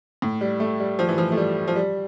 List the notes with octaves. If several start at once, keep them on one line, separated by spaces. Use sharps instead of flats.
A2
G3
A3
G3
F3
E3
F3
A3
G3
F3
G3